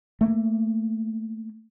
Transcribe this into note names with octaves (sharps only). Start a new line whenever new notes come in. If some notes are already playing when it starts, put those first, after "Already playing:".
A3 A#3